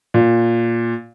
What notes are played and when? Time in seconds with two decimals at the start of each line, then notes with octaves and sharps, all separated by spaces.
0.14 A#2